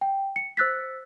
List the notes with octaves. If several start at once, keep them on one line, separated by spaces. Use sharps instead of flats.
G5
C#7
C5 E6 F#6 A6 B6